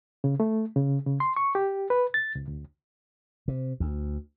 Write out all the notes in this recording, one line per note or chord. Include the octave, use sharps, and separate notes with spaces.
C#3
A3
C#3
C#3
C6
C#6
G4
B4
A6
C#2
D2
C3
D2